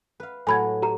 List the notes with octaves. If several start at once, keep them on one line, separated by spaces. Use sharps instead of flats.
B4 F5
A2 F#3 G#5 B5 G#6
G4 A#5